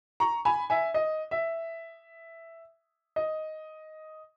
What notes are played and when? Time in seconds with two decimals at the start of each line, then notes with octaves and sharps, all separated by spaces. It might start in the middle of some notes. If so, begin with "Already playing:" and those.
0.20 A#5 C#6
0.45 G#5 B5
0.70 E5 G#5
0.94 D#5
1.31 E5
3.16 D#5